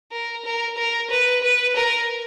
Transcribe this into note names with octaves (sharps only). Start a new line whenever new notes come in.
A#4
A#4
A#4
B4
B4
A#4